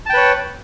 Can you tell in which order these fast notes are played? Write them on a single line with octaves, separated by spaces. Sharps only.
A5 G5 B4 C#5